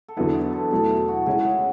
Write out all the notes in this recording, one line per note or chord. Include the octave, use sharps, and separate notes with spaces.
A4
E2 D3 F#3 B3 E4 G#4
A4
A4
B2 F#3 A3 E4 A4
G#4
F#4
C#3 G#3 C#4 E4 G#4
F#4 G#4